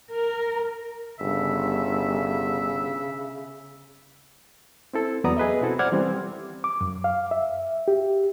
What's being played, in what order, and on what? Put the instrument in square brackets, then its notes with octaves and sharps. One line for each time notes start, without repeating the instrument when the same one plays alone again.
[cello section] A#4
[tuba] G1 [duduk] C#3 [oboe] E5
[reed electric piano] C4 E4 A4
E2 F#3 B3 D5 A#5 D#6
G#4 B4 D#5 E5
B2 C4 E4 F#4 A4
C5 D5 F#5 D6 F6 G#6
E3 G3 C4
D6
F#2
F5
E5
G4